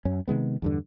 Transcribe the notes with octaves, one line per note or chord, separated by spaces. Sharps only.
F#2 C#4
C3 D#3 G#3 B3
E2 G2 D3